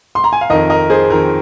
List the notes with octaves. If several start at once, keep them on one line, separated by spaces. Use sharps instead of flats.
C6
A#5
G#5
F5
F2 D#3 A#4 D#5
A#4 D#5
G#4 C5
F2 D#3 A#4